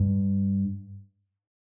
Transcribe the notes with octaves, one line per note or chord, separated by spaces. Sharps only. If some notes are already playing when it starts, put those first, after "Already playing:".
Already playing: G2